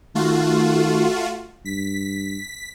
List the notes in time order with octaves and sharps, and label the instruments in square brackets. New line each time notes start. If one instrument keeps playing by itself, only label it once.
[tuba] D#3 [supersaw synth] A3 F4 F#4
[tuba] G2 [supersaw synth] B6